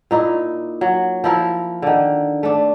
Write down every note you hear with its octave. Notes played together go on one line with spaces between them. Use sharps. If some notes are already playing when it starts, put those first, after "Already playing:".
A#2 D#4 E4
F#3
F3 E4 A#4
D3 D#3
A3 D4